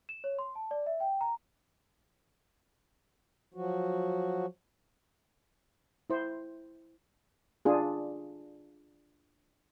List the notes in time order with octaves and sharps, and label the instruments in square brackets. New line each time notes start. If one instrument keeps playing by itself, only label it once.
[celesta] E7
C#5
C6
A5
D5
E5
G5
A#5
[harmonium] F3 F#3 F#4
[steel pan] E4 C5
D4 F4 G#4